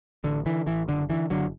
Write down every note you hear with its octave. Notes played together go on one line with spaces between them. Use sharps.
A1 D3
D3 E3
A1 E3
F#1 D3
D3 E3
F#1 D3 F#3